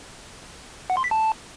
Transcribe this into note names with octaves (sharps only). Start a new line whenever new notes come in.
F#5
C6
B6
A5